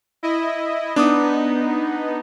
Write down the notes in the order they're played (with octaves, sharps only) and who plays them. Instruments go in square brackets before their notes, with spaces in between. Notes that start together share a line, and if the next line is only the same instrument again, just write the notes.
[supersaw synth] E4 D#5
[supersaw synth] B3 D#4 [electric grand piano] D4 D6 D#6